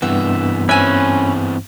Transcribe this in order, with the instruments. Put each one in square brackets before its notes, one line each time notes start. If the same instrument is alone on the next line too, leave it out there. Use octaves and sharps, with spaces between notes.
[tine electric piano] G2 B3 [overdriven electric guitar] C3 E3 [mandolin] E5
[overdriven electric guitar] E3 C4 [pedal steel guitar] C#4 B4 [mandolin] E5 G#5